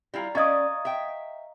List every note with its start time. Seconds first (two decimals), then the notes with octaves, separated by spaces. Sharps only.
0.14 G3 E4 F4 A#5 A#6
0.35 C#4 D5 D#5 F5 C#6 D#6 G#6 A6
0.85 E5 G5